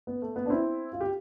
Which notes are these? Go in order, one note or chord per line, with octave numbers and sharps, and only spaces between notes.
B3
A3
B3
D4
C4 E4
F4
G4